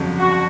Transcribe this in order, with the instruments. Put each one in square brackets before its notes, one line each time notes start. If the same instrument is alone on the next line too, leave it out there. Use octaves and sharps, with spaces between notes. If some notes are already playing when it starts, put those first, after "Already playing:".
Already playing: [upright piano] G1 F2 C#3 F#3
[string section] F#4